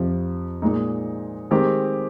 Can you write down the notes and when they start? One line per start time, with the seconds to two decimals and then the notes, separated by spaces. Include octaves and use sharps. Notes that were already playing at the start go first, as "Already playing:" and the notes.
Already playing: F2 C3 F3
0.62 A#2 G#3 D#4
1.51 D#3 G#3 C4 G4